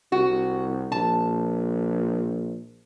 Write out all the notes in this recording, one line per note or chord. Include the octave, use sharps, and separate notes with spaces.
C2 F#4
A#1 A5